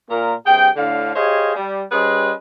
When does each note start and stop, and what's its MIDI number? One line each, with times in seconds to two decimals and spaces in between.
0.11 0.34 46
0.11 0.34 70
0.47 0.69 43
0.47 0.69 48
0.47 0.69 68
0.47 0.69 79
0.76 1.11 45
0.76 1.11 50
0.76 1.11 77
1.15 1.53 67
1.15 1.53 68
1.15 1.53 72
1.15 1.53 73
1.15 1.53 75
1.15 1.53 77
1.55 1.83 55
1.92 2.33 55
1.92 2.33 61
1.92 2.33 68
1.92 2.33 71
1.92 2.33 72
1.92 2.33 75